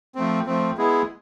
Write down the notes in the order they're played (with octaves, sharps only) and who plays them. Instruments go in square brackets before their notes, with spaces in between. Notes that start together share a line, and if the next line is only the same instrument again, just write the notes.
[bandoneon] F3 A3 C4
F3 A3 C4
G#3 B3 E4 G#4